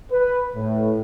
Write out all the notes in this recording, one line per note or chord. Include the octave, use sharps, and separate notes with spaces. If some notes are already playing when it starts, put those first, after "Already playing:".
B4
A2